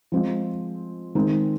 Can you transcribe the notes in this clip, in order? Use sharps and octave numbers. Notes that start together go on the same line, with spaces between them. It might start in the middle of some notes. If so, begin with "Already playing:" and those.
F3 G#3 C4
D#3 G#3 C4 D#4